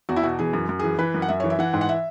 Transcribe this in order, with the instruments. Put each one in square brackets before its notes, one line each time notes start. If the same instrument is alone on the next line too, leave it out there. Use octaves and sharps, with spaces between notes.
[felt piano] E2 F#4
E4
B2 F#4
E3 G#4
F#2
F#2
E3 G#4
E3 B4
F#2
F#5
F#2 E5
E3 C#5
E5
E3 F#5
G#2
F#5
E5